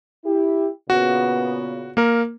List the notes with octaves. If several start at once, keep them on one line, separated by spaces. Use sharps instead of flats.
E4 G4
A#2 C#3 B3 F#4
A#3 A#4